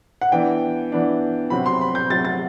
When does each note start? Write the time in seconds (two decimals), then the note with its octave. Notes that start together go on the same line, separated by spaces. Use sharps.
0.21 F#5
0.32 E3 B3 D4 G5
0.92 E3 B3 D4
1.50 C3 F#3 C4 B5
1.66 C6
1.81 B5
1.95 G6
2.10 C3 F#3 C4 A6
2.25 A6